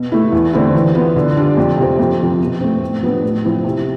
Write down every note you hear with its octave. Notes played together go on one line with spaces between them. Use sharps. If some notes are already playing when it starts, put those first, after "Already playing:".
Already playing: B2
A3 E4
E2
D3 A3 C4 E4
E3
B3 F4
D3
G3 D4 F4
F2
C3 F3 C4
F2
C3 F3
B2
A3 C4
A2
F3 B3 D4
A2
F3 C4 E4
C3